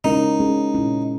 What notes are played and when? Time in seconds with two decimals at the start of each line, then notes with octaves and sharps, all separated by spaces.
0.04 G#3 C#4 D#4 E4 A#4
0.39 G#3 C#4 G#4
0.74 A#2 G#3 C#4 E4